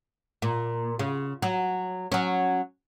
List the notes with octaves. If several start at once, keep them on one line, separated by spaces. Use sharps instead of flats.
A#2
C#3
F#3
F#3 C#4